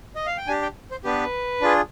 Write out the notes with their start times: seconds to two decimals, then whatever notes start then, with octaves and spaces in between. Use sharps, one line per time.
0.16 D#5
0.26 F5
0.37 G5
0.47 D4 G4 G#5
0.62 G5
0.91 C5
1.04 B3 D4 G4 B4
1.61 D4 F4 G#4